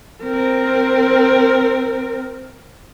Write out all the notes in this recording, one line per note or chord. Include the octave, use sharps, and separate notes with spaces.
C4 A#4